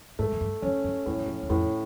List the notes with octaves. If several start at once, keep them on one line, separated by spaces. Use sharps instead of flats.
G#2 A3
F#2
G2
F#2 C#4
F#2
F2 A2
F#2
F2
E2
F2 A2